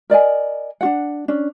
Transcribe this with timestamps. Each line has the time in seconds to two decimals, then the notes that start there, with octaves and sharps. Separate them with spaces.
0.10 A#4 D5 D#5 G#5
0.81 D4 F#4 F#5
1.28 C#4 D4